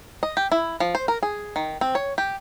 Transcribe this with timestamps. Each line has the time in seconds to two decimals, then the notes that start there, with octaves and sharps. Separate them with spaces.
0.23 D#5
0.37 G4
0.52 E4
0.80 F3
0.95 C5
1.08 A#4
1.23 G#4
1.56 D#3
1.81 C4
1.95 C#5
2.18 G4